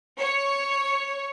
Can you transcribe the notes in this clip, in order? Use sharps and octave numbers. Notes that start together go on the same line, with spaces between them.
C#5